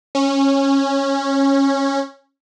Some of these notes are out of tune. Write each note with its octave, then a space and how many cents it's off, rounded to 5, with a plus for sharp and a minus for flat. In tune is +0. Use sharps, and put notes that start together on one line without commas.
C#4 -15